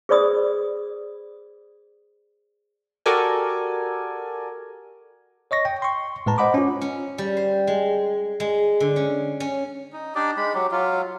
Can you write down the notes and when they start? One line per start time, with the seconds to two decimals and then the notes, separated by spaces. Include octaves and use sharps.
0.09 G#4 B4 C5 D5 B5 D#6
3.06 F#4 G4 A4 A#4 D5 G#5
5.51 C#5 D#5 C#6 A#6
5.65 G5
5.82 C6 C#6
6.26 A2 G#3 B4 A5 A#5
6.38 C5 D#5 F#5 B5 D6
6.54 C#4 F4
6.82 C#4
7.18 G3
7.37 C5
7.67 G#3
8.40 G#3
8.80 D3
8.96 C#4
9.40 C#4
9.93 D#4
10.15 D4 D#4 G4 D5
10.37 G#3 B5
10.54 F#3 G4
10.72 F#3 F4